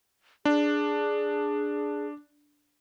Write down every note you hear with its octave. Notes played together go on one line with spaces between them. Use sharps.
D4 G#4